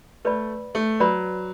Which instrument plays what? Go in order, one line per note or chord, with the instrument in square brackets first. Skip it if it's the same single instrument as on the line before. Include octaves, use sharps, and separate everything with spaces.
[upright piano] A3 [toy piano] B4 D5 B5
[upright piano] A3
[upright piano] F#3 [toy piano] B4 D5 B5